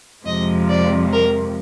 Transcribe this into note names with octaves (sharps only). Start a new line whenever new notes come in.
F2 C3 F3 G#3 D#5
D5
A#4